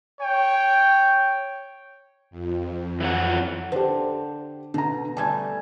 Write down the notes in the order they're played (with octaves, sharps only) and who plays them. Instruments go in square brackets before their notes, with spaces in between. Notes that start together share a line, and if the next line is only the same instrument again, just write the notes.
[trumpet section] C#5 G5
[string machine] F2
[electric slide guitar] E3 F#3 F#5
[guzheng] D3 [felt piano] G4 C5
[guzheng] B2 [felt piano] D3 A#5
[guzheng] G3 A3 [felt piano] G#5 A5 G#6